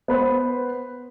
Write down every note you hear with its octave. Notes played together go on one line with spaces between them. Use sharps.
B3 B4 C5